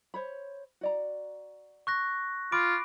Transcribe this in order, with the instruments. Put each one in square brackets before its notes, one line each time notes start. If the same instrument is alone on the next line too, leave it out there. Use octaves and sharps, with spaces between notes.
[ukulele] C5 C#5 B5
F#4 D5 A#5
[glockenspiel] C#6 F#6 A#6
[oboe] F4 [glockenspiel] B5 D6 D7